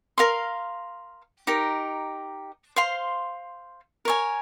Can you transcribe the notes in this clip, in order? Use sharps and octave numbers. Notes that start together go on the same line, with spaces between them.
A#4 F5 C6
D#4 G4 A#4
C5 F5 C6
A#4 C#5 G#5